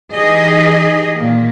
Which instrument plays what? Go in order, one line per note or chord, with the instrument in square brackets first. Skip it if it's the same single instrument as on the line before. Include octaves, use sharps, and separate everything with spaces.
[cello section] E3 D#4 G4 G#4 D#5
A#2 D#3 A#3